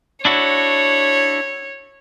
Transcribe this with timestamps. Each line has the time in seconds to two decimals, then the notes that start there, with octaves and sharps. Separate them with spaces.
0.25 D4 E4 F#4 C#5